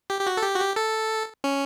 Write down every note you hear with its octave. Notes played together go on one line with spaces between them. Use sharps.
G4
G4
F#4
A4
G4
F#4
G4
A4
C#4